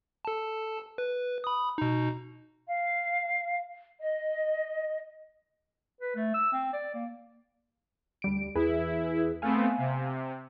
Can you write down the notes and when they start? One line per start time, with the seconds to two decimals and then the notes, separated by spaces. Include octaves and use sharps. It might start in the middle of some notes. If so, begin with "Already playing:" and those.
0.25 A4 A5
0.98 B4
1.44 B5 D#6
1.78 B2 D#4
2.67 F5
4.00 D#5
6.01 B4
6.15 A3
6.34 E6
6.53 C4
6.73 D5
6.94 A#3
8.22 D2 G3 D7
8.55 E2 E4 G#4 B4
9.42 A3 B3 C4 F5 G#5
9.78 C3